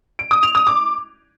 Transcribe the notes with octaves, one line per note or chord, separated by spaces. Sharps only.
D7
D#6
F7
D#6
D6